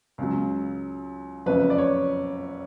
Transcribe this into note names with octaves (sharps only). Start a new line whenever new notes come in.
C#2 C#3 F#3
F#1 F2 C#3 B4
D5
C#5